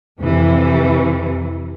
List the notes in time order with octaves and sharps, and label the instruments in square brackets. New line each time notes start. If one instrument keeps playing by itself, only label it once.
[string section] F2 C3 E3